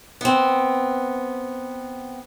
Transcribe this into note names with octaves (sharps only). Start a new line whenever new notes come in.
B3 C4